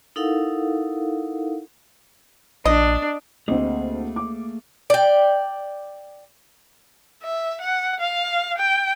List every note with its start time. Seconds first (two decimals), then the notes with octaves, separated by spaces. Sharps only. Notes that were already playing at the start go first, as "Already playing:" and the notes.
0.16 D#4 E4 A4 A#4 F5 F#5
2.65 A#1 D4 D#5
3.48 D2 A3 A#3 C4 G#4 D#5
4.16 D6
4.90 D5 G5
7.23 E5
7.62 F#5
8.00 F5
8.58 G5